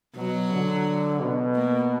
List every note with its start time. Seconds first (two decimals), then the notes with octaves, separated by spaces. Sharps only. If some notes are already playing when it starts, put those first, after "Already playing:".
0.16 B2 F#3
0.51 D3
1.21 B2
1.55 A#3